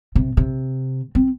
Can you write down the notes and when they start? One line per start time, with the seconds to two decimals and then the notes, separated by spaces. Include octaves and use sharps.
0.15 C3
0.37 C3
1.15 C4